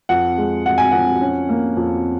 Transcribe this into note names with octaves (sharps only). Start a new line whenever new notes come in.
F2 F#5
G#3
G#3 F#5
G#5
F2 F#5
C#4
A#3
F2